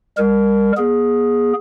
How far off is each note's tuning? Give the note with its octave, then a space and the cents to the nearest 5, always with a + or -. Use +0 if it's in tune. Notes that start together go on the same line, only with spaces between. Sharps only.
G3 +40 A#4 +0
B3 -45 G#4 +0